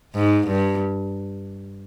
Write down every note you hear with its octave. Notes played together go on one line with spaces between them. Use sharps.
G#2
G2